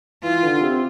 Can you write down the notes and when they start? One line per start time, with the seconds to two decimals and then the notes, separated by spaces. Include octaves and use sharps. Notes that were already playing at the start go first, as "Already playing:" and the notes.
0.23 E3 F4
0.43 D3
0.61 C3